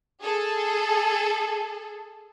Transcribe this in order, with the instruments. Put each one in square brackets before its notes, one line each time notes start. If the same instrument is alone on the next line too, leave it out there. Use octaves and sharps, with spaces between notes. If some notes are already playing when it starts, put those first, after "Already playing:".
[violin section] G#4 A4